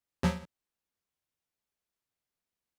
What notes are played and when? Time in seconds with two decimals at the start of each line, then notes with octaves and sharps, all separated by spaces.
0.23 D#2 F3 F#3